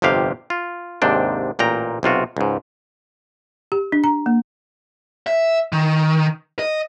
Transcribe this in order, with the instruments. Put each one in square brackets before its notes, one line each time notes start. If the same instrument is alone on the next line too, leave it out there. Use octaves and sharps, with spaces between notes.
[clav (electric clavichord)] G1 F2 C3 G4 F5
F4
D#2 G#2 C3 D4 G5
A1 A#2 G5 A#5
B1 C3 F4 F#4
C#2 G#2
[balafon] G4
D4
A#5
A#3
[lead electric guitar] E5
D#3
D#5